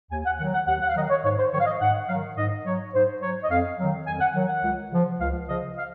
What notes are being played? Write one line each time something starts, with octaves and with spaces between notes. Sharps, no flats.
D#2 G#5
F#5
D#3 F#3 F#5
F#5
D#2 F#5
F#5
F5
D#3 F#3 D#5
C#5
G#2 C#5
C5
D#3 F#3 C#5
F5
D#5
G#2 F#5
D#3 F#3 F5
G#2 D#5
F#3 C#5
G#2 C5
F#3 C#5
D#5
F2 F5
D#3 F#3
F2 G#5
F#5
D#3 F#3
F#5
C#2
C#3 F3
C#2 F5
C#3 F3 D#5
F5